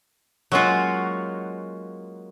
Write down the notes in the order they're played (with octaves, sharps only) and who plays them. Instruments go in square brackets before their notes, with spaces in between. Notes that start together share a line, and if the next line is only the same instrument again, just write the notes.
[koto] F#3 G#3 A#3 C#4 F4 F#4